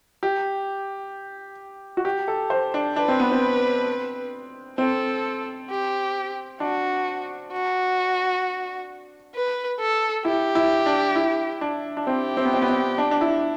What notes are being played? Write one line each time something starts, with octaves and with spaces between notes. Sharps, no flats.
G4
F#4
G4
A4
C5
D4
D4 B4
C4
B3
C4
C4 A4
G4
D4 F#4
F#4
B4
A4
E4 G4
E4
D4
E4
D4
D4
C4 G4
C4
B3
C4
B3
C4
D4
D4
E4